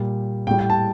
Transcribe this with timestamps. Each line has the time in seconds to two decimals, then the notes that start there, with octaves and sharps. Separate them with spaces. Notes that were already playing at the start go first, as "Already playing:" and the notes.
Already playing: A#2 G3
0.47 A2 G5
0.51 G3
0.59 G5
0.70 A5